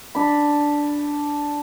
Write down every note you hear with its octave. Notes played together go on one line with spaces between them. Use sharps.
D4 B5